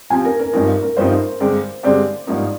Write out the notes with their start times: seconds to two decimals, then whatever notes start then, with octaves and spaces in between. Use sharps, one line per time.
0.10 C3 F3 C4 G#5
0.25 A#4
0.39 A#4
0.53 G1 G2 F3 C4 D#4 A#4
0.82 A#4
0.97 G1 G2 F3 C4 D#4 C5
1.40 G2 D3 G#3 C4 G4
1.83 G2 D3 G#3 C4 G4 D5
2.27 G#1 G2 F3 A#3 D#4